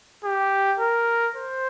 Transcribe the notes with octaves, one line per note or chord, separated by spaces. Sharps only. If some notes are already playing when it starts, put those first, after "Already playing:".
G4
A#4
C5